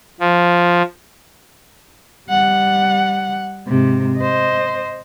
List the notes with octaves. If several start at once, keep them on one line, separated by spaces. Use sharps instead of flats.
F3
G3 F#5
G#2 C3
C5 D#5